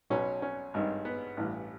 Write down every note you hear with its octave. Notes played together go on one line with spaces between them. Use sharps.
B1 B2 F#3 C#4
C#4
G#1 G2 D#3
B3
A1 G2 E3